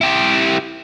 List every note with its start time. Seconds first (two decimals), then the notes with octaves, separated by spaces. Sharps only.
0.01 E4 G4